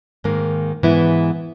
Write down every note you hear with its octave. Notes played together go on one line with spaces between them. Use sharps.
G#2 D#3 A#3
G#2 E3 B3 E4